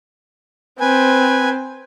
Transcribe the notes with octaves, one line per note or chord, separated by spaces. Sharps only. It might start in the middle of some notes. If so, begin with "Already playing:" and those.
C4 B4 G#5